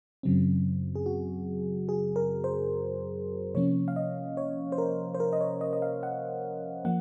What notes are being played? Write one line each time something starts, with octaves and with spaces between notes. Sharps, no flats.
F#2 C#3 F#3 C4
G#4
F#4
G#4
A#4
C5
C3 F3 A#3 C#4 C#5
F5
D#5
C#5
C5
A#4
C5
A#4
D#5
C#5
D#5
D#5
F5
F#5
F3 A#3 F#5